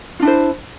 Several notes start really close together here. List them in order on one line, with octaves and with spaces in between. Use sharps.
F4 D4 E4 C5